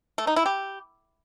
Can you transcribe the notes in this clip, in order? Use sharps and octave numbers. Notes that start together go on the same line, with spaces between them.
A3
D#4
E4
G4